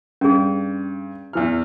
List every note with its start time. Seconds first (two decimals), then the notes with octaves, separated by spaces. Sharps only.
0.21 G2 C#4 G#4
1.33 E2 E3 F6